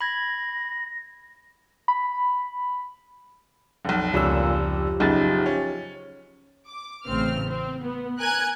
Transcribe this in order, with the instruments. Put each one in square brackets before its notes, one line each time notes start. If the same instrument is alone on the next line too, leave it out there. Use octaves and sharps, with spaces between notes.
[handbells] B5 G#6 [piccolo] A#6
[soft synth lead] B5
[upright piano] F1 B1
[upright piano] F1 G3 C#4 [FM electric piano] C#2 E6 [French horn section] A#2
[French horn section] F3 G4
[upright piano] F#1 B1 C#3 [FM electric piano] D#4 G#4 A6
[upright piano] C#4
[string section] D6
A1 C#3 C4 F6
C4
B3
A#4 G#5 F#6 G#6